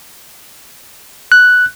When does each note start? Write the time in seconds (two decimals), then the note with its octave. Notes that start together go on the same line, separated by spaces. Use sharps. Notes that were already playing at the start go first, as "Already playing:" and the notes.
1.32 F#6